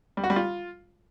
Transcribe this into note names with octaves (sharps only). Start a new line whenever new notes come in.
G3
F#4
G3
F4